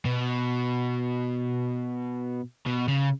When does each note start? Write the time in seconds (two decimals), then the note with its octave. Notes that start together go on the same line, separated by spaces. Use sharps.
0.05 B2
2.67 B2
2.88 C#3